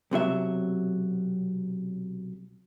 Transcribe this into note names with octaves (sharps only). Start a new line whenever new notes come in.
B1 C3 F#3 E5